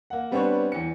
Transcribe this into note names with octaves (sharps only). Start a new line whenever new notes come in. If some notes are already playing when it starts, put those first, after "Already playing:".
A#3 F#5
G3 B3 C4 D4 B4 C#5
E2 C#7